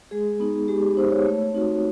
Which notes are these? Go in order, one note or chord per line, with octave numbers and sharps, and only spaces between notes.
G#3 G#4
B3 D#4
G#3 G4
G4
B3 D#4 C5
C#5
A3
C4 D#4 F#4